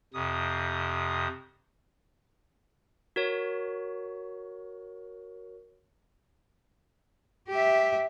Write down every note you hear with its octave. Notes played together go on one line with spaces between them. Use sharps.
F2 C3 D#6
F#4 A#4 C#5
G4 E5